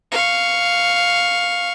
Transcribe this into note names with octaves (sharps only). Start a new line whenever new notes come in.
F5 C#6